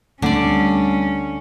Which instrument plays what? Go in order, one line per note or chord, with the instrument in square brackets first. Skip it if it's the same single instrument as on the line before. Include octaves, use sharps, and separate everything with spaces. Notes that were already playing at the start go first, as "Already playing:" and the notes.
[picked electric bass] D2 A3 C4 [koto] D3 D5 [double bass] G3 [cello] C#4